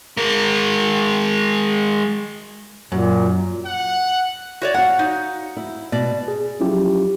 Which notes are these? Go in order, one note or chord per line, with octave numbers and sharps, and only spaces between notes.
G#3 A#4
F#2 A#2
F#5
F#4 C#5 D5
F#4 F5 F#5
D#4
E4
B2 D5
G#4
F3 F#3 C#4 E4 F4 G4